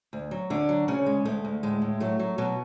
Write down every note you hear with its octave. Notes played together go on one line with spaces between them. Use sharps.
D2
F#3
D2 D3 D4
F#3
D2 C#3 C#4
G#3
D2 A3
D2
A2 G#3
A2
F#3 A3
F#3
B2 F#3 B3